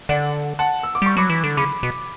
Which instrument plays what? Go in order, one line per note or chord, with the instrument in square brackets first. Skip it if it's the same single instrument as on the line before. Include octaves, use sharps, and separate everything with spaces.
[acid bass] D3 [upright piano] D5 F#5
[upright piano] F#5 A5
E6
D6
[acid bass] G3 [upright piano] C#6
[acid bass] F#3 [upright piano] B5 D6
[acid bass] E3
D3
[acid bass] C#3 [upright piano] B5 D6
[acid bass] B2